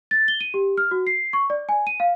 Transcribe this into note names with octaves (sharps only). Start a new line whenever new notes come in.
A6
G7
D#7
G4
F6
F#4
C7
C#6
D5
G#5
D#7
F5